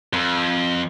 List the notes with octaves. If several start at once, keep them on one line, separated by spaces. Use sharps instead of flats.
F2